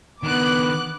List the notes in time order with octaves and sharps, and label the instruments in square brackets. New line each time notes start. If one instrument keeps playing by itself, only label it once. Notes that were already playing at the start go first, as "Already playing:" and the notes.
[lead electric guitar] D#3 D4 [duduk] B3 [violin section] D6 F#6